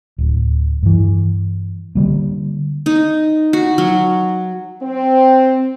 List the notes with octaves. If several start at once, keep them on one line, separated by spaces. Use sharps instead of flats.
D1
G2 E3
D3 F#3 G3 A#3
D#4
F#4
F#3
C4